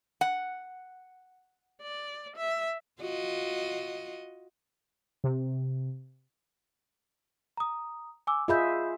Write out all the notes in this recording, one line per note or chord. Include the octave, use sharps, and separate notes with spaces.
F#5
D5
E5
F4 F#4 D#5
C3
A#5 D#6
G#5 D6 E6
F4 G#4 D#5 E5 B5 G6